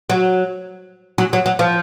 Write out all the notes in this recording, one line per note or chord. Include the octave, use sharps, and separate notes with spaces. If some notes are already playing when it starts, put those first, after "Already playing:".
F#3
F#3
F#3
F#3
F3